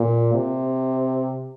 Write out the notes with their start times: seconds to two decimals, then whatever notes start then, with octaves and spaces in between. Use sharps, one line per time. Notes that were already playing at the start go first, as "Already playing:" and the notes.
Already playing: A#2
0.34 C3